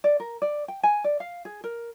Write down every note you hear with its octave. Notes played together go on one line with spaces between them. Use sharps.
D5
A#4
D5
G5
G#5
D5
F5
G#4
A#4